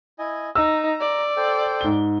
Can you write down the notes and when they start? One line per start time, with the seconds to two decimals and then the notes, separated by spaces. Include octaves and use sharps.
0.19 E4 D#5 G#5
0.55 D#4 A#5 E6
1.00 D5
1.37 A4 C5 G5
1.81 G#2 G7